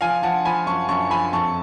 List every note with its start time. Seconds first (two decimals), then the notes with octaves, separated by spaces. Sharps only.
0.01 F3 F5 G#5
0.23 F3 F#5 A5
0.45 F3 G#5 B5
0.67 F#2 A5 C#6
0.88 F#2 A5 C#6
1.10 F3 G#5 B5
1.32 F2 A5 C#6